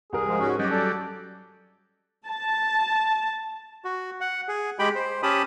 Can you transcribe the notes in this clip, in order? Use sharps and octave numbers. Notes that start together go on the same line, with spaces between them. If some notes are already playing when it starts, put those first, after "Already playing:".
C2 G#4 A#4
F3 G#3
G#2 C#4 F#4
F#3 G3 C#4 D#5 D6
A4 D5
A5
F#4
F#5
G#4
G#3 G4 G5 B5
C5
C#4 G4 A5 B5 D#6